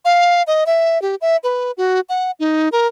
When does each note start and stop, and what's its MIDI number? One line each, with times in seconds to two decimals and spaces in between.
0.05 0.43 77
0.47 0.64 75
0.66 1.01 76
1.02 1.15 67
1.21 1.37 76
1.44 1.71 71
1.77 2.00 66
2.09 2.31 78
2.40 2.69 63
2.72 2.87 70